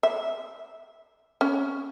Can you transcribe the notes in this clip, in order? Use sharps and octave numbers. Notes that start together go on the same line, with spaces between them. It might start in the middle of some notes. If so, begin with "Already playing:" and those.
E5
C#4